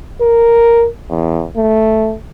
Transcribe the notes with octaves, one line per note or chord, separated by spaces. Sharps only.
A#4
E2
A3